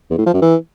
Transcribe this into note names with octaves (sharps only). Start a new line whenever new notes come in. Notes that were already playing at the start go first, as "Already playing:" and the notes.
E2
A2
F3
F#2
E3